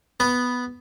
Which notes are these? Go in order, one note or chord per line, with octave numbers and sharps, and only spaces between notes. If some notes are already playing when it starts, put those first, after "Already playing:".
B3